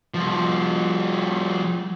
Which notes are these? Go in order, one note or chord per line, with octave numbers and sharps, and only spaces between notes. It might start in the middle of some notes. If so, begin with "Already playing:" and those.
F3 G3